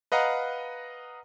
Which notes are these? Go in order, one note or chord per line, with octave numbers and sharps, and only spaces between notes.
B4 D#5 F5 F#5 A#5